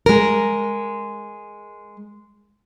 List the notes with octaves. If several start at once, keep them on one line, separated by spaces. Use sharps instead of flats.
G#3 A#4